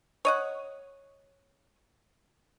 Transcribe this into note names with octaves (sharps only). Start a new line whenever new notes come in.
C#5 D#5 F#5